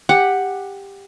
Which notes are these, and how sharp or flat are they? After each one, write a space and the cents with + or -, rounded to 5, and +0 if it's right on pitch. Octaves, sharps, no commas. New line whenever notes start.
G4 +15 F#5 +0